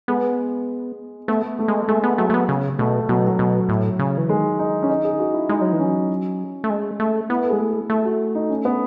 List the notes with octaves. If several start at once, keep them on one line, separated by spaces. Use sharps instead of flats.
G#3 B3
A3 B3
A3
G#3
G#3 A3
B3
F#3 A3
A3
B3
C#3
B2 A3
B2 F#3
F#3
B2
A2
C#3
E3
D#3 G#3
D#4
C#4
D#4
G#4
F#4
E4
G#3 D#4
F#3
E3
C#4
F#3
A3
G#3
A3
B3 E4
A4
G#3 G#4
A3
G#4
A3 A4
F#4
D#4
C#4
B3